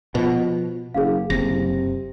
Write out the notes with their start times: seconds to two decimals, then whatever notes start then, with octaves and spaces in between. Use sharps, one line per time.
0.15 B2 F3 B4
0.94 F#1 G#4 F5
1.30 F#1 C3 A#6